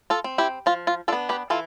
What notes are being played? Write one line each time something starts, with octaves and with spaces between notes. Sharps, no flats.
F4 A4
C4
E4 G4
F3 F4
F4
B3 D4 F4 A4
G4 B4
E3 F4 A4